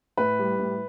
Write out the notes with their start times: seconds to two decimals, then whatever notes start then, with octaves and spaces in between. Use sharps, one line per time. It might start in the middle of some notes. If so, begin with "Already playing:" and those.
0.17 A2 B4
0.39 G3
0.59 A2